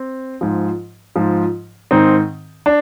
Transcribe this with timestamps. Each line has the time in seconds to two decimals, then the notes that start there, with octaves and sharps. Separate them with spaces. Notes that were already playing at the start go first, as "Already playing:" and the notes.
Already playing: C4
0.41 G#2 F3
1.16 G#2 F3
1.91 G#2 D#3 C4 D#4
2.66 D4